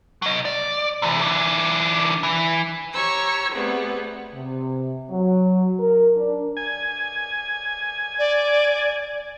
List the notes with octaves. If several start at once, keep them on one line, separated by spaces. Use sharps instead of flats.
F#3 D#5
D5
C3 E3
E3 D4
E3
G4 C#5 A#5 C#6 E6
G3 A3 B3 C4 G#4
C3
F#3
A#4
D4
G#5
D5